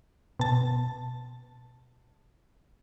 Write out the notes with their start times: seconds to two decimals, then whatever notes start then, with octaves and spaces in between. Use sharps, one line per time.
0.39 B2 A5